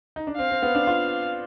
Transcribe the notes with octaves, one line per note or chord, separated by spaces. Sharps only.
D#4
D4
C4 F5
C4
B3
D4
F4